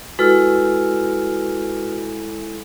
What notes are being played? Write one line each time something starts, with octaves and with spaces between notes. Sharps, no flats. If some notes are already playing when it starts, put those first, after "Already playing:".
G#3 E4 F#4 A4 B4 F6